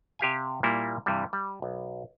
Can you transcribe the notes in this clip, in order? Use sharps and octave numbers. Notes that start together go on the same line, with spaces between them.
C3 G4 F5 G#5
A#2 G3 A#3 E4
G2 C3 E3 G3
G3
B1